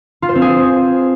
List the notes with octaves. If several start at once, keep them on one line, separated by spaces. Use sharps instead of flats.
F4
C5
C4
G#4